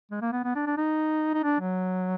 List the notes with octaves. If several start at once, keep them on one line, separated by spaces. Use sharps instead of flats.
G#3
A#3
B3
B3
D4
D4
D#4
D#4
D4
F#3